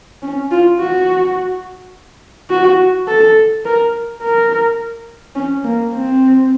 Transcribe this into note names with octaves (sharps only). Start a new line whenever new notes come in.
C#4
F4
F#4
F#4
A4
A#4
A#4
C#4
A#3
C4